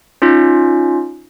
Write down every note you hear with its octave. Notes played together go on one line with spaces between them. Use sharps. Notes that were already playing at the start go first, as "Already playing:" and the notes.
C#4 D#4 F4